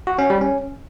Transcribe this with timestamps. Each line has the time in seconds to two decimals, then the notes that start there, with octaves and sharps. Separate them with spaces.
0.07 F#4
0.19 C#4
0.30 G3
0.41 C#4